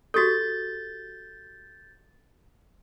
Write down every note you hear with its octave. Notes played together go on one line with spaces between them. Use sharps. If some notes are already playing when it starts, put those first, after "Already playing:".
F#4 G4 A4 G6 A6